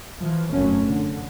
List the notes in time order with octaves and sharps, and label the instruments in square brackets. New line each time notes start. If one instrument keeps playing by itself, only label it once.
[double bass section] E3 F3
F1 F#2 F#3 A3 C#4
D3